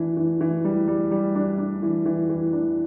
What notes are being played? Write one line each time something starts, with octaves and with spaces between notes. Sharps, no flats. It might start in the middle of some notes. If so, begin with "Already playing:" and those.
Already playing: E3 D4
E3
E3
G3
G3
G3
D4
D4
E3
E3
E3
D4